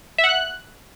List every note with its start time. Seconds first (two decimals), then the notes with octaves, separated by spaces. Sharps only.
0.18 E5
0.24 F#5
0.29 F#6